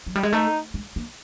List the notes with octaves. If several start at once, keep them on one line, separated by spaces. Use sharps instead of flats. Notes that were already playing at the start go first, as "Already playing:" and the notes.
F#3
G3
G#3
A3 D#4
G#3
A#3